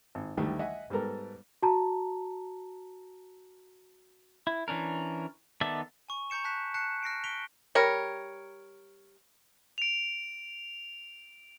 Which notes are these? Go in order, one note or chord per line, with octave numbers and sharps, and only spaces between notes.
G#1
D2 D#3 G3 A3
D#5 E5 F#5 G#5
G#2 G3 B3 A4 A#4
F#4 A5 A#5
E4
E3 C#4 D4 A#4
D#3 B3 A4 D5 E5
G#5 C#6
A#5 C#6 G6 C#7 E7
A5 F#6 B6 E7
A5 F#6 C7 C#7
F6 A#6 C7 D7
B6 D7 F7 G7
G3 A#4 C#5
D7 F7